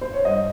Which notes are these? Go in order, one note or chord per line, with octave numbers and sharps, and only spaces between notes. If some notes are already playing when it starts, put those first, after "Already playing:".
C5
C#5
G2 D#5